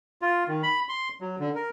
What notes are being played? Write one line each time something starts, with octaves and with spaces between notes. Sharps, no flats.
F4
D#3
B5
C6
F#3
D3
A#4